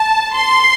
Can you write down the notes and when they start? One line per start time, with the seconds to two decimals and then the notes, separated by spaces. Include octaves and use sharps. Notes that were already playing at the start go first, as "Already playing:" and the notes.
Already playing: A5
0.34 C6